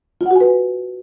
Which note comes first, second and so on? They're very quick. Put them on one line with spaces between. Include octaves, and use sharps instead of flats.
F4 F#5 F#4 G#5 B4